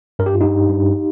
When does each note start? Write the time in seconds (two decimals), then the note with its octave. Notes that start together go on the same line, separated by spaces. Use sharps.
0.19 G2 A#4
0.26 G4
0.34 F4
0.41 G2 D#4 G4
0.69 G2